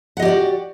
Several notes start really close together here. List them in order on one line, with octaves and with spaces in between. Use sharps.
F#5 D#5 G4 D5 F#4